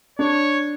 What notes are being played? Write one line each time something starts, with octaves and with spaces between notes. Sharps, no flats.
D4 C#5